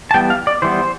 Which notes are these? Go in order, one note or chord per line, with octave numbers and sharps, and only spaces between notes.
A5
E3 G3 B3 G5
F5
D5
E3 G3 B3 C5